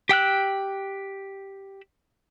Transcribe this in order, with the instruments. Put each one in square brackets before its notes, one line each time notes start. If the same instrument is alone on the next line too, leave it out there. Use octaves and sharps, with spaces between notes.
[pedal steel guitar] G4 G5 E6 F#6